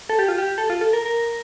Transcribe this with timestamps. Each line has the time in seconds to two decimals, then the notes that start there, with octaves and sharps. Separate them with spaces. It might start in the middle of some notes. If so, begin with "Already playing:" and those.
0.09 A4
0.19 G4
0.28 F4
0.38 G4
0.58 A4
0.70 F4
0.81 A4
0.93 A#4
1.06 A#4